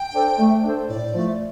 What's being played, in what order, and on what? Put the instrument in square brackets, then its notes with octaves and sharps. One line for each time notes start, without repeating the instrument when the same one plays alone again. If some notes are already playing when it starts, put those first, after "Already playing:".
Already playing: [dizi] G5
[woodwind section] D4 A4 C5
A3
D4 A4 C5
[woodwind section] A2 [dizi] D5
[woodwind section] F3 A3